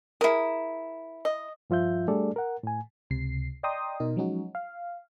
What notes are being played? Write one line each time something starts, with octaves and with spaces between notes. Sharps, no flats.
E4 G#4 A#4 D#6
D#5
G2 F3 F4 E5 G6
G3 A3 D4 G#4 A4 D5
A#4 F#5
A2 G#5
C#2 C3 C7
D5 D#5 G5 A#5 C6 D#6
B2 D#4 A#4
F3 F#3 G#3 C#4 D#4 F#4
F5